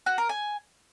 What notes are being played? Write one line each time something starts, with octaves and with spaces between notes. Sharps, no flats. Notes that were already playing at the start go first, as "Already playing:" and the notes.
F#4
A#4
G#5